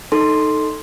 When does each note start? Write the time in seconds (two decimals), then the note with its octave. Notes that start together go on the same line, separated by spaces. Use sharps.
0.12 D#4 A4 C6